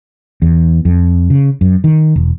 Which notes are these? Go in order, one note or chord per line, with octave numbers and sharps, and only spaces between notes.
E2
F2
C#3
F#2
D#3
E1